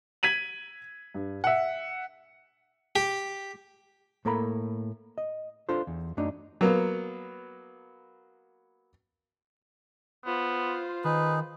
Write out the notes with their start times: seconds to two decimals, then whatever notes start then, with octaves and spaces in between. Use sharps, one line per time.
0.23 G#6 B6 D#7 F#7
1.15 G2
1.44 E5 F#5
2.96 G4
4.25 A2 A#3 A4 A#4 A#5 B5
5.18 D#5
5.69 D4 F4 A4 C5
5.87 E2
6.17 F#2 F#3 A3 D4 D#4
6.61 F#3 A#3 B3
10.26 B3 F4 C5
11.04 D#3 D#4 G#4 B4